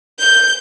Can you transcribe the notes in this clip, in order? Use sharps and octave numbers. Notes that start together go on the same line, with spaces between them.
G6